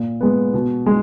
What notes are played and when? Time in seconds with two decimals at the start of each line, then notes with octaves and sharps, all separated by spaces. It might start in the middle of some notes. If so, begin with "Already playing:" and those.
Already playing: A#2
0.21 G#3 B3
0.54 B2
0.86 G#3